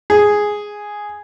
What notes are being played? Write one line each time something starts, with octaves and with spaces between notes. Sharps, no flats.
G#4